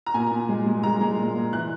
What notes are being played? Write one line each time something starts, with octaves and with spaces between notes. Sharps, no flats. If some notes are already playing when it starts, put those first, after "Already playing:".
A#5
A#2 G#5
A#2
G#3
G#3
G#3 A#5
G#3
A#2
A#2
E3 F#6